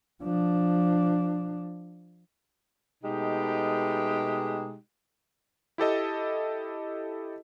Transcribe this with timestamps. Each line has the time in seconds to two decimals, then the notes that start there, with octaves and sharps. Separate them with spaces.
0.23 F3 D4
3.04 B2 G#3 A3 D#4 G4
5.78 E4 G4 A4 D#5